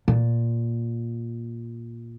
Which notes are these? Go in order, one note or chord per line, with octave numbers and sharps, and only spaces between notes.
A#2